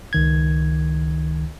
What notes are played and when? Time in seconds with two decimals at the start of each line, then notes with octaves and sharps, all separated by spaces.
0.13 C#2 D#3 G#6